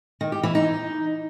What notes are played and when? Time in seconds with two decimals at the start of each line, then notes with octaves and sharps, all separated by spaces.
0.21 D#3
0.32 G4
0.43 E3
0.55 D#4